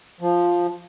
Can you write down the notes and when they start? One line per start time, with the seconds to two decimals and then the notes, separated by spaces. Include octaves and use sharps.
0.21 F3